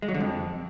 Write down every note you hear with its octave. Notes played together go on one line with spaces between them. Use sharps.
G#3
F#3
D3
F2